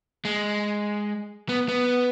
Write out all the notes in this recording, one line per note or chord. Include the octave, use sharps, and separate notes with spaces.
G#3
B3
B3